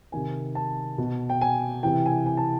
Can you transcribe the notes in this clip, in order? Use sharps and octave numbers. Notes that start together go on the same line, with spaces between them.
C3 D#3 G#5
A5
B2
G5
G#5
C3 E3 G5
G#5
G#5
A5